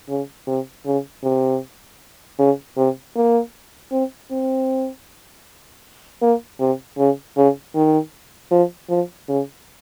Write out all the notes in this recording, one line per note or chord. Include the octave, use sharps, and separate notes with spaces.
C#3
C3
C#3
C3
C#3
C3
A#3
C4
C4
A#3
C3
C#3
C#3
D#3
F3
F3
C#3